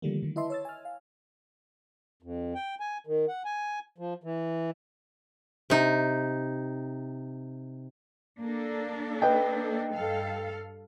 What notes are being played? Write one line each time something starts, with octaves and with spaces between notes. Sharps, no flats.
D3 D#3 F3 G3 A3 A#3
D3 D#3
E4 B4 D#5 E5 A5 C6
C#5 E6 A6
G#5 F6
F5
F2
G5
G#5
D#3
F#5
G#5
F3
E3
C3 D#4
A#3 D4 A4
B4 D#5 G5
G2 A4 F5